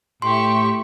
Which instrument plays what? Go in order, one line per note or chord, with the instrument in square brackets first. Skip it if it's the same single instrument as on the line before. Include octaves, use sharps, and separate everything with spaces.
[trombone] A2 [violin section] G4 E5 C#6 [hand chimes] C6